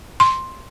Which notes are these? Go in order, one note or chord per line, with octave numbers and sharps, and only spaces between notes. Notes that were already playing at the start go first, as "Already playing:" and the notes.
C6